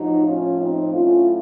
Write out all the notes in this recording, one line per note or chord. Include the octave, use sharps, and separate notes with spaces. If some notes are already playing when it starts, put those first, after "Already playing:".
Already playing: A2 F3 D#4 F#4
C#4 F4
C4 D#4
A2 F#3 C#4 F4